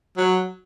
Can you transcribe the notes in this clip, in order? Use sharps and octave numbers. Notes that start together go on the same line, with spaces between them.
F#3